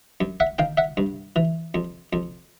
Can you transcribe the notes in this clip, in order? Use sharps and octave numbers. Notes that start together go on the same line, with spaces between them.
F#2
E5 F#5
D#3 F5 G5
E5 F#5
G2
E3
F2
F2